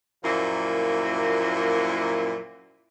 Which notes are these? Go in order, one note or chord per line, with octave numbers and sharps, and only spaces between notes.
F#2 A#2 F3 A#3 E4